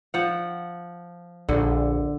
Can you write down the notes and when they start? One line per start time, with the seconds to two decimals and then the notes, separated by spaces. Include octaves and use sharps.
0.14 F3 F#5
1.49 A#1 D3